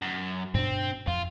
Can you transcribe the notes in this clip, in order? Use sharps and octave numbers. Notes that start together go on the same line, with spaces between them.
F#2
G2 B2 C4 D4
F2 F4